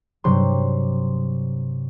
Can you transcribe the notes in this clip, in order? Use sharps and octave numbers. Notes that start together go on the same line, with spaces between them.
G2 C3 F#3 G3 C6